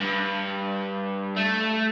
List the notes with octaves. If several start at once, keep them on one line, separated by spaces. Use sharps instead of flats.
G2
A3